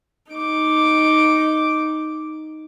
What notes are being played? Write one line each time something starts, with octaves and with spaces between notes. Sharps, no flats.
D#4 D6